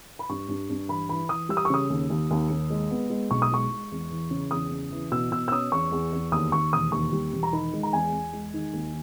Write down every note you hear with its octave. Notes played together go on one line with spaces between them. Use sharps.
B5
G2 C#6
G2
G2
E3 B5
E3 B5
E3 D#6
G3 E6
D#6
C#6
C#3 D#6
D#2
D#2
D#2
D#2
G#3
B3
G#3
B1 C#6
D#6
G#3 C#6
G#3
E2
E3
C#3
E2 D#6
C#3
E3
B2 E6
B2 E6
E6
C#4 D#6
E2 C#6
E2
E2
D#2 D#6
D#2 C#6
E1 D#6
D#2 C#6
G3
E1
A#5
D#3 B5
G#3
A#5
E2 G#5
E2
G#3
D#3
D#2